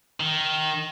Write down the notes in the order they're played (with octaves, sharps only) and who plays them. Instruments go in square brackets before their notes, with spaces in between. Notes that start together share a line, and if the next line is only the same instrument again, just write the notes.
[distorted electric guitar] D#3